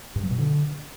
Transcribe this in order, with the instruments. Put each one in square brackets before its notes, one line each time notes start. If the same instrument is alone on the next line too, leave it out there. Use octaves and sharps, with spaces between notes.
[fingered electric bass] G2
F#3
B2
D3